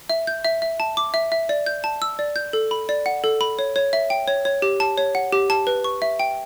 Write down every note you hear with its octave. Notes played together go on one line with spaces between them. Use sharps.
E5
G6
E5
E5
A5
D6
E5
E5
D5
G6
A5
E6
D5
G6
A4
B5
D5
F#5
A4
B5
C#5
C#5
E5
G5
C#5
C#5
G4
A5
C#5
F#5
G4
A5
B4
C#6
E5
G5